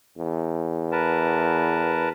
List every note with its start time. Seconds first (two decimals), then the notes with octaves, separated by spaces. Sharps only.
0.18 E2
0.92 A#4 B4 A5